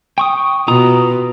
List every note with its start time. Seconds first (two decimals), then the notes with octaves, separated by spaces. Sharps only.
0.18 G5 C#6 D#6
0.68 B2 F4 A#5 D#6